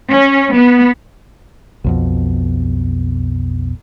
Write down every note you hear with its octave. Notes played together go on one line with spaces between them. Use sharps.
C#4
B3
B1 F2 B2